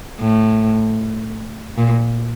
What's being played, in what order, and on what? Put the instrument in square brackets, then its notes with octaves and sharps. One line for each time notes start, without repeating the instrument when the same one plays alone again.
[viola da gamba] A2
A#2